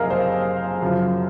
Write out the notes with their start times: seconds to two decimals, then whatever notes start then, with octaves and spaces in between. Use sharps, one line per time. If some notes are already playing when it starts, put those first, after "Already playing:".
Already playing: F#1 F2 C3 G#4 A#4 D#5 F5
0.10 C5
0.82 F#2 C#3 F3